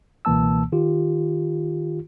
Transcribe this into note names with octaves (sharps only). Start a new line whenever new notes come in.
C#2 B2 E3 A#3 A5 E6
D#3 F4 G4